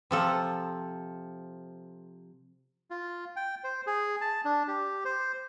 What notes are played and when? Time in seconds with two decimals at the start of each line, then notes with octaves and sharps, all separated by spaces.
0.11 C3 F3 A4
2.91 F4
3.36 G5
3.64 C5
3.87 G#4
4.21 A5
4.45 D4
4.68 G4
5.05 C5